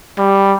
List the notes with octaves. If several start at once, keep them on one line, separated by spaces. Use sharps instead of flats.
G3